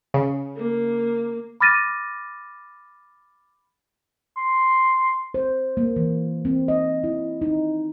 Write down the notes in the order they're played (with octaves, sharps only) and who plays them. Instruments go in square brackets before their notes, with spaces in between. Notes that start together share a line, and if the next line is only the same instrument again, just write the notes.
[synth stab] C#3
[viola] A#3
[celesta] B5 D6 F6 A6 A#6 D#7
[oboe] C6
[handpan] C5
A#3
E3
C4
D#5
E4
D#4